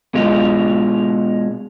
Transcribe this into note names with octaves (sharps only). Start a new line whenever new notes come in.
B2 G#3 F4